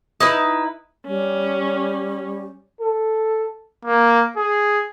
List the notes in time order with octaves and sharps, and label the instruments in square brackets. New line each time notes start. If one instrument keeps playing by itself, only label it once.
[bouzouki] D#4 E4 B4
[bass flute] G3 [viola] C#4
[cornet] A4
[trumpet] A#3
G#4